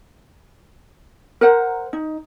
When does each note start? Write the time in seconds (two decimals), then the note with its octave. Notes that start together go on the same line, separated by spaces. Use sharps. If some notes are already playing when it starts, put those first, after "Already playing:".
1.41 A#4 C5 F#5
1.93 D#4